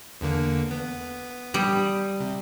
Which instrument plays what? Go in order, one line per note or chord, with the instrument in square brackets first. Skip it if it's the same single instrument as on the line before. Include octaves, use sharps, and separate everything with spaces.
[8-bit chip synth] E2 D3 A#3
B3
[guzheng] G3 [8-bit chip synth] D#6
[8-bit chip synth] C3